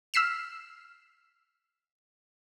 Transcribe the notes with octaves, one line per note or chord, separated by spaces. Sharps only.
E6 F6 B6 C7 E7